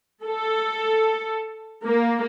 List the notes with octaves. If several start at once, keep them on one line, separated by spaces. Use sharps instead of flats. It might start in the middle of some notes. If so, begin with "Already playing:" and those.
A4
A#3